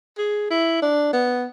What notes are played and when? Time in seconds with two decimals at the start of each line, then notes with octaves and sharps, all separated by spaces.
0.18 G#4
0.50 E4
0.82 D4
1.13 B3